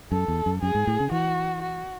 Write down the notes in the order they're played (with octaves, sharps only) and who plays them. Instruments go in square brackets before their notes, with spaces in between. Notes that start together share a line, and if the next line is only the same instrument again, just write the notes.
[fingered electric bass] F#2 [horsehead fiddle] A4
[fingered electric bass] E2
F#2
[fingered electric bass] F#2 [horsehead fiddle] G#4
[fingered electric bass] G#2
A2
C#3
[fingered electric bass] E3 [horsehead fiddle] F#4
[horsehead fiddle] F#4